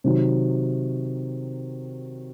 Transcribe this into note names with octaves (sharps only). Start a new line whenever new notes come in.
C3 D#3 F#3